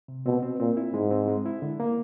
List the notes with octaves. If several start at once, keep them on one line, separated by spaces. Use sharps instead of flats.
C3
B2 C4
C4
A#2 C4
E4
G#2 G#3
C4
G#3
E4
D3
A#3